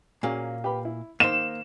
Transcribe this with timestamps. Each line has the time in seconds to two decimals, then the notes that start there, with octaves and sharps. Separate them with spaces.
0.23 A#2 A#3 C#4 F#4 G#4
0.64 G4 B4 B5
0.85 E4
1.20 D#3 A#3 C5 E7